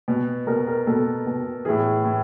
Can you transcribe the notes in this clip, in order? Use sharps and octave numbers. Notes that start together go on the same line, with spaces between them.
B2
B2 A#4
A#4
B2 A4
B2
A2 E3 G#4
A2